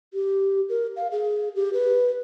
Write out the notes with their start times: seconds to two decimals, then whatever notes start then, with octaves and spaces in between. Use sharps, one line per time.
0.14 G4
0.69 A#4
0.96 F5
1.12 G#4
1.55 G4
1.73 B4